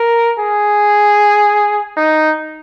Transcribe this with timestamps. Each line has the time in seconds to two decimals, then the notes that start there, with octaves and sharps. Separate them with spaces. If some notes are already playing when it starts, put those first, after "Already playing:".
Already playing: A#4
0.39 G#4
1.97 D#4